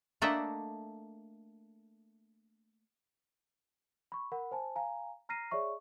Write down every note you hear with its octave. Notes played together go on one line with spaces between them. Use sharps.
A3 A#3 D4 D#5 E5 F#5
B5 C#6
A#4 F#5 B5
C5 G#5 A5
F5 G#5 A#5
A#5 F6 A#6 C7 D#7
G#4 C#5 D5 E5 C#6